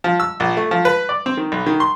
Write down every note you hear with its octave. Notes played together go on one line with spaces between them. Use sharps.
F3
E6
A#1
A3
F3
B4
D5
C4
D#3
B1
D#3
C6